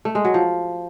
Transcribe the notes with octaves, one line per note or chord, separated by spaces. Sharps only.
A3
G#3
F#3
F3